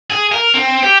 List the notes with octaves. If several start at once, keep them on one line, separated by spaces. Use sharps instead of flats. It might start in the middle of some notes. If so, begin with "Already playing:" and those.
G#4
A#4
C4
G4